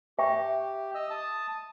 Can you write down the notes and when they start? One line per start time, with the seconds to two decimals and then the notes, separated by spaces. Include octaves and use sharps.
0.19 G4 E5 G5 C#6
0.95 D#5 E6
1.10 A5 D#6